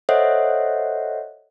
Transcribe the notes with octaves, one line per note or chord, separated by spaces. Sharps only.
A4 C5 C#5 D#5 E5 F#5